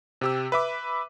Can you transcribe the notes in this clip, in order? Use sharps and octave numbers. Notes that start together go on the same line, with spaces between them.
C3 G4 E6
B4 E5 D6